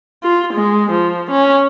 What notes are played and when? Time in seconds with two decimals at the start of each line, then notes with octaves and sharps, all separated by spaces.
0.23 F4
0.53 G#3
0.91 F3
1.31 C#4